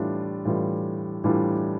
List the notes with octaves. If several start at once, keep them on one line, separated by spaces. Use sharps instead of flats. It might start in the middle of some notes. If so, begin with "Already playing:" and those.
Already playing: A2 E3 G3 D4 F4
A2 E3 G3 D4 F4
A2 E3 G3 D4 F4